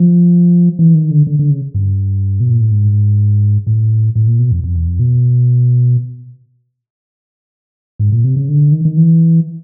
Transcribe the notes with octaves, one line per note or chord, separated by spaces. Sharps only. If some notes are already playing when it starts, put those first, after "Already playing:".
Already playing: F3
E3
D#3
D3
D3
D3
C#3
G2
B2
A#2
A2
G#2
A2
A2
A#2
B2
F2
F2
E2
F2
B2
G#2
A#2
C3
C#3
D3
D#3
D#3
E3